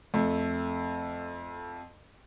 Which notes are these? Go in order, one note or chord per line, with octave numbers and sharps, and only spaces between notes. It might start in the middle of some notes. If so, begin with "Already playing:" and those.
F2 A3